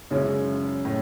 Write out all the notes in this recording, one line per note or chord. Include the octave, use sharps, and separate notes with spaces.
F#2 C#3 G#3 C#4 E4
A2